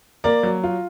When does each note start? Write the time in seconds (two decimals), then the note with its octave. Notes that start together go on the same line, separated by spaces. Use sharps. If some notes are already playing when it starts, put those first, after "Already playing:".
0.24 A#3 A#4 D5
0.43 F#3
0.63 F4